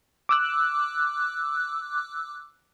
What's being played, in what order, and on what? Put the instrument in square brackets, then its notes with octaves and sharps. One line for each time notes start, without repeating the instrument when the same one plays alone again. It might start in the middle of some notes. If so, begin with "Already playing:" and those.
[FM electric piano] D6 E6 F#6